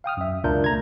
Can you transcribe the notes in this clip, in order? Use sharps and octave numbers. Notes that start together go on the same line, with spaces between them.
F5 G5 D#6 F6
F#2 E5
C#2 B2 D4 F4 A#4 G6
A3 A#5 G#6